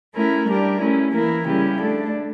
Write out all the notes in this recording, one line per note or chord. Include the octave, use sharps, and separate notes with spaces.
A3 C#4 E4 A#4
G3 D4 G4 A#4
A3 C#4 E4
E3 A#3 E4 A#4
C#3 G3 C#4 E4 G4
A3 D4 A4